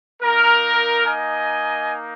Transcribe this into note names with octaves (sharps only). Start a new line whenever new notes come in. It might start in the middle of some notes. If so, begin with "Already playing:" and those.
A#3 D#4 A#4
D#5 G#5